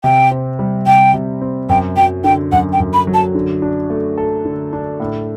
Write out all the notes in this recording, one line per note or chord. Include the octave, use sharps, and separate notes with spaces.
C3 G5
C4
G3
C3 G5
C3
C4
F#2 G5
F#3 G5
D3 G5
F#2 F#5
G5
F#2
B5
F#3
A5
D3
D4
A3
A4
D3
D4
A2